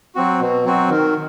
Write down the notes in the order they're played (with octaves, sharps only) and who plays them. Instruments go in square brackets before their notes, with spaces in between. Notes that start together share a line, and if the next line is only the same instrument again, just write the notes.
[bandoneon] F#3 C4 F#4
B2
F#3 C4 F#4
D#3